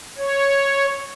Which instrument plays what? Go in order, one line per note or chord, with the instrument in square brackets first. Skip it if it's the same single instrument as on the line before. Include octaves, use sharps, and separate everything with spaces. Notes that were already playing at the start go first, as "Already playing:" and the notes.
[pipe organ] C#5